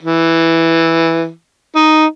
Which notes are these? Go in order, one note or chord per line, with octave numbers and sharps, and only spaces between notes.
E3
D#4